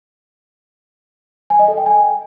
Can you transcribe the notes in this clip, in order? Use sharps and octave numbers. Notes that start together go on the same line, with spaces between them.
G#5
D#5
A4
G5
G#5